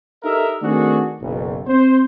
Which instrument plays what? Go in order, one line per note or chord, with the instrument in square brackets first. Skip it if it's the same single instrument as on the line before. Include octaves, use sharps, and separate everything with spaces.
[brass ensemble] D#4 G4 A4 A#4 D#5 E5
D#3 A3 C4 D4 F#4 G#4
F#1 B1
C4 C5